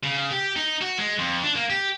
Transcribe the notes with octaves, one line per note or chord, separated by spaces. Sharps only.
C#3
G4
D#4
F#4
G#3
F2
D4
A#3
G4